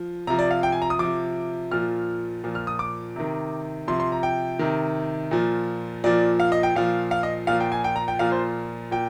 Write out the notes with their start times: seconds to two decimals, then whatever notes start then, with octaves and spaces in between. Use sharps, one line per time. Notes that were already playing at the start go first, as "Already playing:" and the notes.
Already playing: F3
0.27 C3 F3 A#5
0.39 D5
0.51 F5
0.63 G5
0.72 G#5
0.82 A#5
0.90 D#6
0.99 C3 F3 D6
1.71 A#2 F3 F6
2.44 A#2 F3
2.55 F6
2.67 D#6
2.79 D6
3.16 C3 D#3
3.88 C3 F3 C6
4.00 C6
4.12 A#5
4.23 G5
4.59 C3 D#3
5.31 A#2 F3
6.04 A#2 F3 D5
6.40 F5
6.52 D#5
6.63 G5
6.75 A#2 F3 F5
7.11 F5
7.23 D#5
7.47 A#2 F3 F5
7.60 G5
7.72 G#5
7.84 G5
7.96 A#5
8.08 G5
8.19 A#2 F3 F5
8.32 C5
8.91 A#2 G5